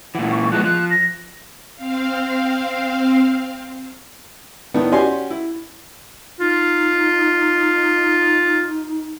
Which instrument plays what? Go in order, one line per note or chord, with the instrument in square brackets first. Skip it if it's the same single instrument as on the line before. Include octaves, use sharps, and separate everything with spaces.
[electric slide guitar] A#2 E3 [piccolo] F#5
[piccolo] C#6
[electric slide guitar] F3 G#3 B3 [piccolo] F#6
[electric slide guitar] F3 [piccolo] F#6
[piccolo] A#6
[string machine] C4 F5
[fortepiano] A2 D#3 B3 D4
C#4 F#4 G4 D5 G#5 C6
E4
[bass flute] D#4 [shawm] F4